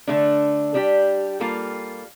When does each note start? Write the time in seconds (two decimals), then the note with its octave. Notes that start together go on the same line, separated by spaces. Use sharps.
0.08 D3 A3 D4
0.74 G3 D4 G4
1.40 G3 A#3 F4 A4